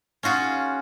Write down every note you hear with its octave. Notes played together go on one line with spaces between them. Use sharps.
C#4 F4 F#4 G#4